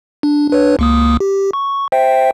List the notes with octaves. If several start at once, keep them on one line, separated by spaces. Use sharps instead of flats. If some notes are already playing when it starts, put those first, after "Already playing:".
D4
D4 B4 C#5
C#2 A#3 D#6
G4
C#6
C5 E5 G5